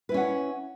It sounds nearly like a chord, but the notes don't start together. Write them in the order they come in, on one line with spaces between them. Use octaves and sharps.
B4 E4 C#4 F#5